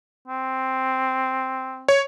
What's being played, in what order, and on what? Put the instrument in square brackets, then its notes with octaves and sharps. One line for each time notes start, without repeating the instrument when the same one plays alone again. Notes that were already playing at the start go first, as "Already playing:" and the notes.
[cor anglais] C4
[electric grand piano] C#5